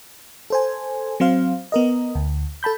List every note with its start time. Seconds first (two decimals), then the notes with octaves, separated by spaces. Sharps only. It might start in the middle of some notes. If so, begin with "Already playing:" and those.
0.50 A4 C5 G#5
1.20 F#3 C4 C5 F5
1.72 B3 A#4 D#5
2.15 D2
2.63 A4 A5 B5 G6